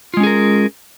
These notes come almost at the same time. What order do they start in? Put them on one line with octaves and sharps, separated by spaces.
F4 G#3 C#4 G#4 A#4